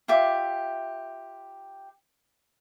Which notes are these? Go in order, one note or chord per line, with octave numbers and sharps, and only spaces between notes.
F4 G4 E5 D6